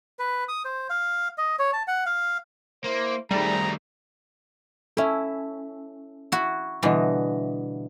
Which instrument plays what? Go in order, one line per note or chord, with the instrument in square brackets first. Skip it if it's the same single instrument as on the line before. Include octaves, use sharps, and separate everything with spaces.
[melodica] B4
D#6
C5
F5
D#5
C#5
A5
F#5
F5
[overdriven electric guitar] A#3 [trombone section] E4 C5
[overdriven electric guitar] D#3 A3 [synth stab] G3 [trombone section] C4 G#4 [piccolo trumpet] A#5
[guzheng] C#4 E4 [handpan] A4 E5
[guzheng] E4 F#4
[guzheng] B2 D3 E3 [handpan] G3 E4 D#5